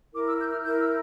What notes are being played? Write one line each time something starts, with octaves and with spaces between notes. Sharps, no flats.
E4 A#4 D6
E6
G6
F6
E4 A#4 G6
E6